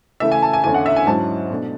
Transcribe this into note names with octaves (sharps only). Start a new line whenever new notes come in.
C#3 E3 A3 E5
G#5
A5
G#5
E2 D3 A3 C#4 E4 G#5
F#5
E5
G#5
G#2 F#3 C#4 E4 A5
B2 A3 D4